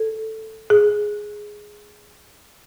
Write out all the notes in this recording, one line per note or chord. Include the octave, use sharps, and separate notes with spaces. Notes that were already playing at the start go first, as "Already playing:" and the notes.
Already playing: A4
G#4